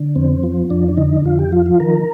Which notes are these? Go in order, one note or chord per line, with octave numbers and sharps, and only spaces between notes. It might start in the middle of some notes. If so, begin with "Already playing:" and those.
Already playing: D3
F2 C4
F3
F2 D4
D4
D3 D#4
F2 F4
G4
F3 F4
F4
D#3 A#4